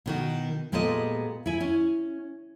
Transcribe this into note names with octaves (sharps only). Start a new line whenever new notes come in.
B2 D#3 F#4
A#2 G#3 B3 G4 A4 D#5
E4 G#5
C#4